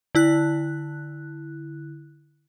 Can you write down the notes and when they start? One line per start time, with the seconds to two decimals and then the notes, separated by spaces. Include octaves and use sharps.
0.15 D3 E4 F#6